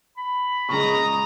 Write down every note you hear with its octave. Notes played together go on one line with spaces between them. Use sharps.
B5
A#2 C#3 G#3 A#5 C#6 D#6